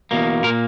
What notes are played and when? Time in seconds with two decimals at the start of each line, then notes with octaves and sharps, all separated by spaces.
0.11 E2 B2 A#3
0.44 A#2 A#4
0.47 A#3